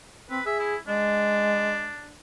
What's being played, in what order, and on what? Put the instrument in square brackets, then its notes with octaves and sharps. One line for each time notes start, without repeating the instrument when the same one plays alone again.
[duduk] C4 [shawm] B4
[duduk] G#4 [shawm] E5
[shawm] E4
[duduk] G#3 [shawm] D4